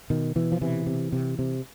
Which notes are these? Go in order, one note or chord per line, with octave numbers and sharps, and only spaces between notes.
B2 D#3
B2 E3
F3
C3 E3
C3
C3
C3